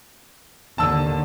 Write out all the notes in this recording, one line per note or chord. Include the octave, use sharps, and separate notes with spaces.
D#2 D3 A5 E6